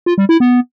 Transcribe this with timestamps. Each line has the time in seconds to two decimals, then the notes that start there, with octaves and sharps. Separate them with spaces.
0.06 F4
0.18 G3
0.29 E4
0.40 B3